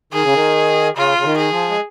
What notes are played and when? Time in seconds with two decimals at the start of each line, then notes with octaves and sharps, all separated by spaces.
0.13 D#3 G#4
0.24 C#3
0.34 D#3
0.97 C#3 F4
1.18 C#3
1.25 D#3
1.38 G#4
1.52 F3
1.69 G#3